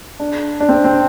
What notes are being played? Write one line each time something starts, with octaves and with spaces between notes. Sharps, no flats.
D4
D4
C4
C4